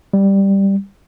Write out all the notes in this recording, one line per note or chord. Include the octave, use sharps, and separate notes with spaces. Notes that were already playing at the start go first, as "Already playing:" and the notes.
G3